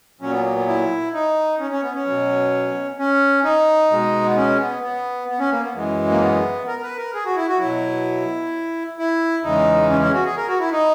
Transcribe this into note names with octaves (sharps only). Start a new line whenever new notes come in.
A#2 F#3 C#4
B3
A#3
B3
E4
D#4
C#4
C#4
B3
C#4
B2 F#3
C#4
D#4
B2 G#3
B3
C#4
B3
B3
B3
C#4
A#3
B3
F#2 E3 G#3
A#3
B3
A#4
B4
A#4
G#4
F#4
E4
F#4
B2 F#3 E4
E4
E2 C#3 E3 G#3 D#4
C#4
C#4
F#4
G#4
A#4
F#4
E4
D#4